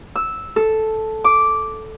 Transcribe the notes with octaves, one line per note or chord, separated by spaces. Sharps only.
E6
A4
D6